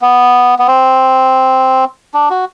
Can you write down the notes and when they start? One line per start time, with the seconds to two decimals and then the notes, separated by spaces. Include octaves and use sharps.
0.02 B3
0.59 B3
0.67 C4
2.14 D4
2.30 F#4